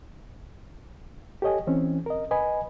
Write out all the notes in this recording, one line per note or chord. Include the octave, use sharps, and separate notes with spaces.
G4 A4 C#5 D#5 G#5
E3 C4 C#4
A#4 D#5
B4 D#5 G#5 B5